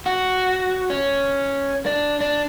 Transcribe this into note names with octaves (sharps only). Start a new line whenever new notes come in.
F#4
C#4
D4
D4